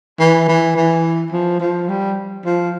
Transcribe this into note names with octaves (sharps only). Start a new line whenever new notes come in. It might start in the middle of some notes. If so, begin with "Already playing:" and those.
E3
E3
E3
F3
F3
G3
F3